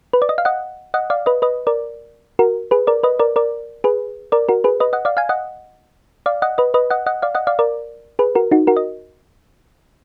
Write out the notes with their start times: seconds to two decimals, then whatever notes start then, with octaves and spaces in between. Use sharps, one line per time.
0.13 B4
0.22 D5
0.29 D#5
0.38 F5
0.45 D#5 F#5
0.94 D#5 F#5
1.10 D5 F5
1.26 B4 D#5
1.42 B4 D#5
1.67 A#4 D5
2.39 F#4 A#4
2.71 G#4 B4
2.87 A#4 D5
3.03 B4 D#5
3.19 A#4 D5
3.36 A#4 D5
3.84 G#4 B4
4.32 A#4 D5
4.49 F#4 A#4
4.64 G#4 B4
4.80 B4 D#5
4.93 D#5 F#5
5.05 D5 F5
5.17 F5 G#5
5.29 D#5 F#5
6.26 D5 F5
6.42 D#5 F#5
6.58 B4 D#5
6.74 B4 D#5
6.90 D#5 F#5
7.06 D#5 F#5
7.22 D5 F5
7.35 D#5 F#5
7.47 D5 F5
7.59 A#4 D5
8.19 G#4 B4
8.35 F#4 A#4
8.51 D#4 F#4
8.67 F#4 A#4
8.77 D#5